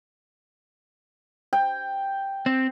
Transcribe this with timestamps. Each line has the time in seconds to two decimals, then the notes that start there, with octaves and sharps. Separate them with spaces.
1.53 G5
2.46 C4